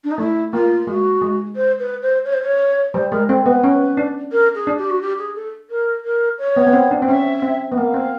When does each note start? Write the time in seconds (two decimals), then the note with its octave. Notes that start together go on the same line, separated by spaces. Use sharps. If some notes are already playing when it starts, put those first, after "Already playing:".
0.04 D4
0.11 D#4
0.18 A3 E4
0.53 A#3 F4
0.87 G#3 F#4
1.21 G#3
1.56 C5
1.79 B4
2.02 C5
2.25 C#5
2.33 C5
2.43 C#5
2.94 G3 C5
3.12 G#3 A#4
3.29 C4 A4
3.46 B3 B4
3.64 C#4
3.97 D4
4.32 A#4
4.55 G#4
4.67 D4
4.78 G4
4.90 F#4
5.01 G4
5.18 G#4
5.36 A4
5.70 A#4
6.05 A#4
6.39 C#5
6.56 B3
6.67 B3
6.73 C4
6.91 D4
7.02 C4
7.08 C#4 E5
7.42 C4
7.72 B3
7.77 A#3 F5
7.94 C4